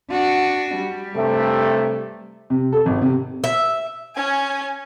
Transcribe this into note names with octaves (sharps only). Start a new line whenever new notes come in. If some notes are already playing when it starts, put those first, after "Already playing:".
D4 F#4
G3
G2 C3 A3
C3
A4
G#1
C3
E5
C#4 G#5